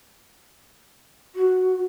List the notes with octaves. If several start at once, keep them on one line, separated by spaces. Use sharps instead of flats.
F#4